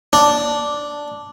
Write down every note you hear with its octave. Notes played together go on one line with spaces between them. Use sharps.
D4